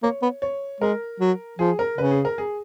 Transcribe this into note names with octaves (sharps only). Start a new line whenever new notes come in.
A#3 C#5
B3
C#5
G#3 A#4
F#3
F3 G#4
A#4
C#3 B4
G#4
A#4
G#4